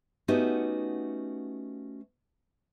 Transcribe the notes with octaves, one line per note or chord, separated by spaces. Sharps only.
A3 B3 C#4 D#4 F#4 G4